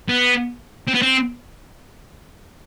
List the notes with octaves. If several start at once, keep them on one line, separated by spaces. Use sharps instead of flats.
B3
C4
B3
C4